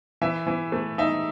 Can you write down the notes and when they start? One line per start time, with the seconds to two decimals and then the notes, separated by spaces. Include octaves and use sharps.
0.21 E3 E5
0.47 E3
0.72 A3
0.98 D#4 E5